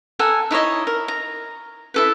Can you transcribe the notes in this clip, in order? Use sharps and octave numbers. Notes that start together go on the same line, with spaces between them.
A4 A#4 F#5 G#5
D#4 E4 C#5 D#5
A#4
A#5
E4 A4 B4